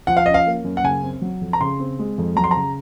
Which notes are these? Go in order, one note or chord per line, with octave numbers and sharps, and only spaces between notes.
F3 F#5
F5
C#4 D#5
F5
A#3
F#2
F#5
C#3 G#5
C4
F#3
F2
A#5
C#3 C6
C4
G#3
F2
F#3 A#5
C6
A#5
C#3